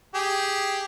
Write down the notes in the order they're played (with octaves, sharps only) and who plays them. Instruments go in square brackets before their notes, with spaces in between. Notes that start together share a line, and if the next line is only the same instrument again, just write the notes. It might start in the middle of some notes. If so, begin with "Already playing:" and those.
[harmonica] G4 G#4